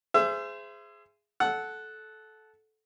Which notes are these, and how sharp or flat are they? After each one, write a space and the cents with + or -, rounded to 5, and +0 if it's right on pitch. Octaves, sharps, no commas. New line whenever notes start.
G#4 +0 C5 -20 E5 +30
A4 -15 F#5 +0